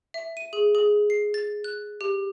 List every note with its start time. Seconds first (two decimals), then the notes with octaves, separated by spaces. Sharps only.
0.14 E5
0.37 D#7
0.53 G#4
0.75 G#4
1.10 C7
1.34 A6
1.64 F#6
2.01 G4